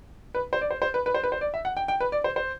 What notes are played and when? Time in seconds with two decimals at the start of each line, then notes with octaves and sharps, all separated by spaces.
0.35 B4
0.53 C5
0.61 D5
0.71 C5
0.82 C5
0.94 B4
1.06 B4
1.14 C5
1.24 B4
1.32 C5
1.41 D5
1.54 E5
1.65 F#5
1.77 G5
1.88 G5
2.00 B4
2.12 D5
2.24 C5
2.36 C5